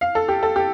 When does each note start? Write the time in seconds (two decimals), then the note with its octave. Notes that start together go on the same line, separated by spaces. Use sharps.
0.01 F5
0.15 A4
0.28 G4
0.43 A4
0.56 G4